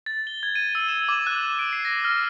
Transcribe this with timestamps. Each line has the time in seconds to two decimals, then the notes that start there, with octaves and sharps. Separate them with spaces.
0.06 A6
0.27 G7
0.43 G#6
0.55 D#7
0.75 E6
0.88 E7
1.09 D6
1.27 F#6
1.59 D7
1.73 C7
1.85 A#6
2.04 F6